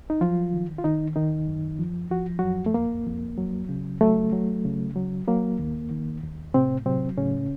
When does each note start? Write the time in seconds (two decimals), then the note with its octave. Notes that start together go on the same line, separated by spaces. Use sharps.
0.10 D#4
0.21 F3 F#3 F4
0.53 D#3
0.78 F4
0.84 D#3 D#4
1.16 D#2 D#3 D#4
1.48 F#2
1.79 F3
2.11 F3 F#4
2.39 F#2 F#3 F#4
2.66 A3
2.74 F2 A#3
3.06 F2
3.38 F#3
3.69 C#3
4.01 F#3 A3
4.33 F#3
4.65 C#3
4.96 F#3
5.28 F#3 A#3
5.59 D#2
5.91 D#3
6.23 D#2
6.54 A2 C3 C4
6.86 C3 F#3 C4
7.18 A2 C#3 C#4